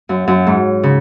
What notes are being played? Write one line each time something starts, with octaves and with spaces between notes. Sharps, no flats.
F#2
F#2
G#2
C#3